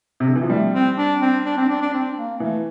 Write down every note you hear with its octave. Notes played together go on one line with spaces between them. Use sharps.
C3
D3
E3
F3
G3 A3
C4
D4
C4
D4
C4
D4
D4
C4
A#3
E3 A3